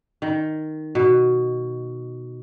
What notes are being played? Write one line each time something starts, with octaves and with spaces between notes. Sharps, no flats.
D#3
B2